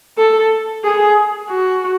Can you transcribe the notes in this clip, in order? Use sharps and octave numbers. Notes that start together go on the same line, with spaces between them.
A4
G#4
F#4